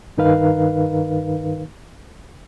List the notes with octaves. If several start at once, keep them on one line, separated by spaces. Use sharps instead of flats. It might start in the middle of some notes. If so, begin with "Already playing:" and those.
G2 D#3 D#4 A#4 B4 F5